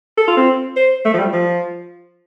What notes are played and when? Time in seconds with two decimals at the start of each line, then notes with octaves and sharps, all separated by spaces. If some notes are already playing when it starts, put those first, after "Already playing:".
0.18 A4
0.28 F4
0.37 C4
0.76 C5
1.05 A3
1.14 F3
1.19 G3
1.33 F3